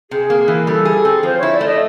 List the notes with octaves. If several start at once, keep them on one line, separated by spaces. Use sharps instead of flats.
C3 G#4
A#3
E3
G3 A4
G#4
A4
C4
F3 C5
E4 C#5
D5
A3 D#5